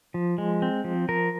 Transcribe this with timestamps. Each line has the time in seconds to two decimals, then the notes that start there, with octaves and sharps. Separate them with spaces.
0.14 F3
0.38 G#3
0.62 C4
0.84 F3
1.09 F3 A#4